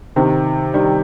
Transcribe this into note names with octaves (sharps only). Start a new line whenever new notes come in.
C3 D#3
D#3 G3